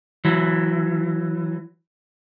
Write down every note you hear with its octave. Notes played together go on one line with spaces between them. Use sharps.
E3 F#3